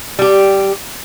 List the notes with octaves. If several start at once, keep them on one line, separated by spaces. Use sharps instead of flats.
G3 G4